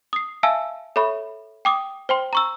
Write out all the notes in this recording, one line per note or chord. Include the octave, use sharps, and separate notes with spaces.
D#6 C7
E5 F5 G#5 A5 E6
A4 C#5 E5 B5 C#6
G5 D6 D#6
C5 G5 C6
A#5 C#6 E6